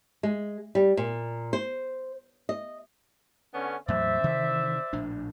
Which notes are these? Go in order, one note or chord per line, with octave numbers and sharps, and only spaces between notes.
G#3
G3
A#2
C5
D#5
D3 B3 C#4
E2 A2 F#3 C5 D5 E5
C3 D#3 E3
A#1 A2 D4